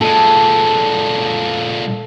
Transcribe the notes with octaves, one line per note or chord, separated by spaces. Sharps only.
A#2 G#3 A4